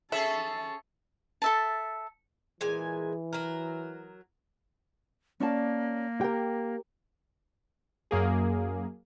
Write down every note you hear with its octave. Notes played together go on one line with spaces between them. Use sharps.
C#4 G#4 A4 E5 A5
A4 E5 A5
A#2 E3 G#3 G#5
F#3 A#4
A#3 C#4 D5 A5
G4 A#4 G5
F#2 A#3 G#4